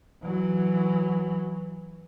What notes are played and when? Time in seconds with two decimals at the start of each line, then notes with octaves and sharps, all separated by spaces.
0.23 E3 F#3